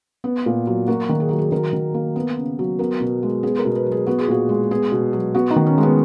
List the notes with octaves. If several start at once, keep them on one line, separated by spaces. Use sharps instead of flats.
B3
A#2
F#3
A#3 F#4
D#3
G#4
F#3 F#4
G#4
D#3 A#4
D#3
A#3
B3
C#3
F#3
B3 A#4
B2
G#3
B3 G#4
A#4
B2
B4
F#3
G#4
B3 F#4
G#4
A#2 F#4
G#3
B3 G#4
B2
F#3
B3 F#4
D#4
D#3
C#4
G#3
B3